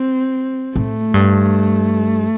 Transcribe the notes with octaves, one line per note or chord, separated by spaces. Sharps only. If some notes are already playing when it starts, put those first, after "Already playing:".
Already playing: C4
A2 A3
G2